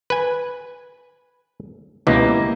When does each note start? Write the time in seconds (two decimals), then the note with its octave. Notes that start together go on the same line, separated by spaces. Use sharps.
0.10 B4 G#5
2.07 C#2 B2 E3 A#3 E4 G4 D#5